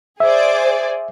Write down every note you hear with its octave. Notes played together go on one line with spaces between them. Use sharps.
G#4 C5 D5 E5